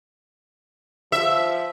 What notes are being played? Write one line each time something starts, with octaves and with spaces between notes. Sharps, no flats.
F3 E5